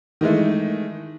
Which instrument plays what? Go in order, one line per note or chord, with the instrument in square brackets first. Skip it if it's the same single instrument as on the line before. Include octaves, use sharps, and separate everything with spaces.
[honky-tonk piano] D#3 E3 G#3 A3